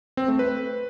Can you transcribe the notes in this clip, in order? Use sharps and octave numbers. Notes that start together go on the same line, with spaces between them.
C4
A3
B4